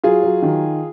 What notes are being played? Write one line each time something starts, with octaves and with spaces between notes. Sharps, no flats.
F#3 F4 G#4
F#3
D#3